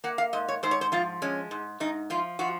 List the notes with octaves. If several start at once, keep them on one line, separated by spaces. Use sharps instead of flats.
A#3 F#5
F5
G#2 D#5
C#5
G#2 C5
C#5
C5
F3 F4
G#3 C#4
G#2
G#2 D#4
F3 F4
F3 F#4